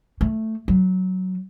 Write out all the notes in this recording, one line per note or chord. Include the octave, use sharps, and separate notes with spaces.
A3
F#3